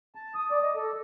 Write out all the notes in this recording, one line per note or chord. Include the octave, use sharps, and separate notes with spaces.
A5
D#6
D5
D#5
A4